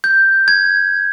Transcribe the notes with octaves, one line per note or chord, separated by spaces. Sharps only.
G6
G#6